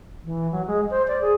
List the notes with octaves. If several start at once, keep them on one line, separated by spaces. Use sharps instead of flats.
E3
F#3
G#3
C5
D5
G#4